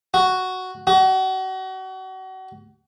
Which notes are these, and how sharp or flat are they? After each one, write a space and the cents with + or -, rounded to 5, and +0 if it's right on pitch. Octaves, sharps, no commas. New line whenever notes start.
F#4 +5
F#4 +35